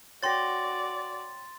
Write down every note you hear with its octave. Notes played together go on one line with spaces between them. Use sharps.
F#4 C#5 D5 G5 C6 A6 A#6